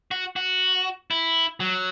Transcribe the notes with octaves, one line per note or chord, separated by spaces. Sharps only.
F#4
F#4
E4
F#3